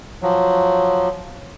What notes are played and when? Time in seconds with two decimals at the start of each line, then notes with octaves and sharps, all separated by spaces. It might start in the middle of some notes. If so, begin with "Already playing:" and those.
0.22 F3 F#3